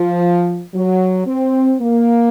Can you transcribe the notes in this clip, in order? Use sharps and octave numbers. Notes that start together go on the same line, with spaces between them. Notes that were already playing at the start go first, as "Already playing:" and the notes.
Already playing: F3
F#3
C4
A#3